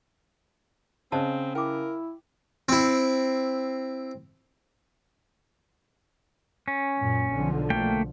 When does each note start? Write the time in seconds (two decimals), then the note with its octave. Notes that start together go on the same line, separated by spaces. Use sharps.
1.12 C#3 C4 C5 D#5 A5
1.55 E4 A#4 G5 D6
2.69 C4 E4
6.68 C#4
6.98 F#2 A#2
7.32 B1 D3 F3
7.70 A3 A#3 G5